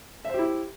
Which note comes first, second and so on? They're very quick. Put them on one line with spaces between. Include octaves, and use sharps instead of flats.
E5 C5 G4 E4